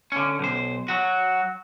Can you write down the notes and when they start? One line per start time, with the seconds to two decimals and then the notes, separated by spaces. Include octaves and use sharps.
0.12 D3 C#4
0.39 B1 C5
0.88 F#3 F#4